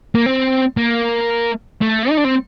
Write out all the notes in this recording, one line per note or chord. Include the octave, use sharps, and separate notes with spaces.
A#3
C4
A#3
A3
D#4
D4
C4